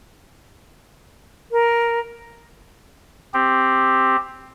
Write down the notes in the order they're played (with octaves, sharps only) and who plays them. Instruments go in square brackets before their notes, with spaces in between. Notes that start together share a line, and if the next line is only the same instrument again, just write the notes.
[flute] A#4
[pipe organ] C4 G4